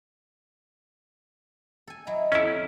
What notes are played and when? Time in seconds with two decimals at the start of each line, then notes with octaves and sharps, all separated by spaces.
1.87 A4 G#5
2.07 F#3 E4 D#5 A#5
2.32 F2 C#4 E4 F#5 A5